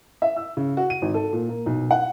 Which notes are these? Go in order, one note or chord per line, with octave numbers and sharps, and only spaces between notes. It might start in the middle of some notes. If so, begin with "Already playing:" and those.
E5
E6
C#3
F#4
D#7
G#1
A4
A#2
A#3
B1
F#5